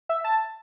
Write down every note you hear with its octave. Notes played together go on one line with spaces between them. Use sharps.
E5
A5